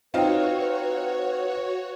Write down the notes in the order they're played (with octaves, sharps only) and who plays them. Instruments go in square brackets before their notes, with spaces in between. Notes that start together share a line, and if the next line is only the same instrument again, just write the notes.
[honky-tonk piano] C4 D#4 F4 [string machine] F#4 C#5 [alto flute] B4 [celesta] F5 G5